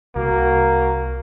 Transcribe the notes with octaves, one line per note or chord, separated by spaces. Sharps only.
C2 A#3 F#4